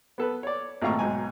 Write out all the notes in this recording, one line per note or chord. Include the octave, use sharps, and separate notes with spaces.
B3 A4 B4
C#5 D5
G#1 A#2 A3 F5 A#5 C#6
B1 G#2 G#5